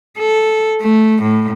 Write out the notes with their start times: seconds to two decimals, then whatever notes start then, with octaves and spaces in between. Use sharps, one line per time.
0.18 A4
0.80 A3
1.22 A2